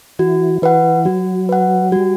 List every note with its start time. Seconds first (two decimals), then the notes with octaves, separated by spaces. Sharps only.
0.19 E3 F#4
0.62 E3 B4 F#5
1.05 F#3 F#4
1.49 B4 F#5
1.92 G3 F#4